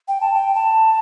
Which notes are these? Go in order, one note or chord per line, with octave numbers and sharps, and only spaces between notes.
G5
A5
G5
A5